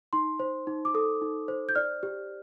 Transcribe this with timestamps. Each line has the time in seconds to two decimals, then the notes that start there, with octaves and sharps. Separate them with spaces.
0.13 D#4 C6
0.40 C5
0.67 D#4
0.85 D6
0.94 A4 D#6
1.22 D#4
1.48 C5
1.69 G6
1.75 D5 F6
2.03 G4